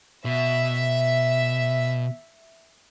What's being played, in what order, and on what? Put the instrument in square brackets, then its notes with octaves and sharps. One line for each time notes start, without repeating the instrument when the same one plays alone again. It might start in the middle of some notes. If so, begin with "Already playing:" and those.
[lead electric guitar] B2 [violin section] E5